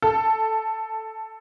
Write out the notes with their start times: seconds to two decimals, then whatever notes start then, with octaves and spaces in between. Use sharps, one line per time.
0.02 A4